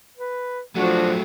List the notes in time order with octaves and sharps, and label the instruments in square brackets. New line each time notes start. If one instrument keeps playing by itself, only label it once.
[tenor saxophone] B4
[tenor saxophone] F3 [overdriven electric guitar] F#3 A3 [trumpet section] D4 F#4